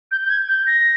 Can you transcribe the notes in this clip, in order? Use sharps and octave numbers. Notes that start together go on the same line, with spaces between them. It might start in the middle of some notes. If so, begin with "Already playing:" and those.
G6
G6
G#6
G6
A#6